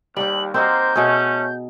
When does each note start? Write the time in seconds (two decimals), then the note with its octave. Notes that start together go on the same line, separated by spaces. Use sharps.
0.17 D#2 G3 G4 F#7
0.54 A#3 C4 D#4 F#4 C5 G6
0.96 B2 A3 C#4 G#4